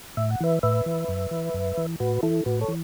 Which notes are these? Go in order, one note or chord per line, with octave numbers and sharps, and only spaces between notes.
A2 E5
F#5
E3 B4 E5
A2 B4 E5
E3
F#2
E3
F#2
E3
A2 F#4 B4
E3 E4 A4
A2 F#4 B4
A4 C#5
E3